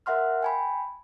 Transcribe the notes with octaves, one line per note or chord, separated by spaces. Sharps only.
A#4 E5 F#5 C6 F6
G5 G#5 B5